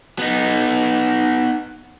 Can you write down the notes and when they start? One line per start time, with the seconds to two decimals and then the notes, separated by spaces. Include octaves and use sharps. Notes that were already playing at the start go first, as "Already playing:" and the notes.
0.19 B3 D#4